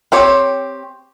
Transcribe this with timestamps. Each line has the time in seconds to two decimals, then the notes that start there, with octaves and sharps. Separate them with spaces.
0.12 C4 G4 C#5